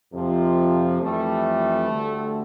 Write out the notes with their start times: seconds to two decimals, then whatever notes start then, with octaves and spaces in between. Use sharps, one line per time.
0.12 F2 C3 F3
1.01 F2 E3 G3 A3
1.90 D2 D3 G3